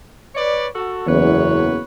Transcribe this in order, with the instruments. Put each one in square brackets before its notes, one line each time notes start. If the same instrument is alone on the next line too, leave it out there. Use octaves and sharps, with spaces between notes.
[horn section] B4 C#5 D5
F#4 A4
[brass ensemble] F#1 E2 [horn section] F#3 B4 C#5